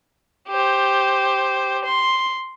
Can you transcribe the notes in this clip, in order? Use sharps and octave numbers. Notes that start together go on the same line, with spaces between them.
G4 C5
C6